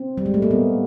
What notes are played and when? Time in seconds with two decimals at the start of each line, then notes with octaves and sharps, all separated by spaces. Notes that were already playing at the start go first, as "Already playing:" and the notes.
Already playing: C4
0.18 G3
0.26 G#3
0.34 A3
0.42 A#3
0.51 B3